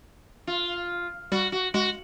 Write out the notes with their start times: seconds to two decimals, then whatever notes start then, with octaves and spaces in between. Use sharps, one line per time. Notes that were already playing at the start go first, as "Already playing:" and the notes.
0.47 F4
1.32 G3 F#4
1.52 F#4
1.74 G#3 F#4